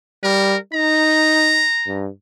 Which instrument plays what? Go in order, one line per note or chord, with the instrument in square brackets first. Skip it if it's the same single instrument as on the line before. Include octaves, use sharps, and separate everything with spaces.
[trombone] G3 [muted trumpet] A#4
[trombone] D#4 [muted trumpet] A#5
[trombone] G2